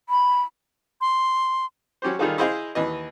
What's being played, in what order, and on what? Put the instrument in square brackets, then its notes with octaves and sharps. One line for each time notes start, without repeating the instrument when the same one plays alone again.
[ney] B5
[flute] C6
[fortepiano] F#3 C#4 G4 C5
D#3 G3 D#4 F4 G#4 A4
E4 G#4 C5 D#5 F5 C6
D#2 E3 D#5